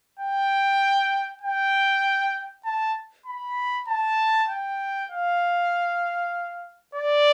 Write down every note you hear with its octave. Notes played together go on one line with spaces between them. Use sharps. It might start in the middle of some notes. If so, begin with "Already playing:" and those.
G5
G5
A5
B5
A5
G5
F5
D5